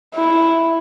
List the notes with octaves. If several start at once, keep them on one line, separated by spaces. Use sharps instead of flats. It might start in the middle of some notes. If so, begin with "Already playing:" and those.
E4